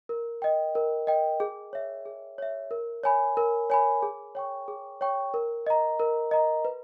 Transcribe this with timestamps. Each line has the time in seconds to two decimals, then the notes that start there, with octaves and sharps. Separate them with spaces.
0.09 A#4
0.42 D#5 G5
0.75 A#4
1.07 D#5 G5
1.40 G#4
1.73 C#5 E5
2.06 G#4
2.38 C#5 E5
2.71 A#4
3.04 C#5 G#5 B5
3.37 A#4
3.70 C#5 G#5 B5
4.03 G#4
4.35 C#5 G5 C#6
4.68 G#4
5.01 C#5 G5 C#6
5.34 A#4
5.67 D#5 A#5
6.00 A#4
6.31 D#5 A#5
6.65 B4